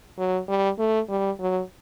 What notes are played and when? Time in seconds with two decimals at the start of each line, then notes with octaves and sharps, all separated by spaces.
0.18 F#3
0.48 G3
0.78 A3
1.09 G3
1.40 F#3